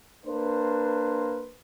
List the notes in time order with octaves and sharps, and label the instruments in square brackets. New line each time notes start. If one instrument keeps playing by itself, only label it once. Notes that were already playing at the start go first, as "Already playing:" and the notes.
[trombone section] A#3 D4 B4 C5